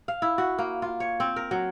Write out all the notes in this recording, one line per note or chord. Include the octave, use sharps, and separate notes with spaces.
F5
E4
F#4
A#3
F4
C#5
C4
A#4
F#3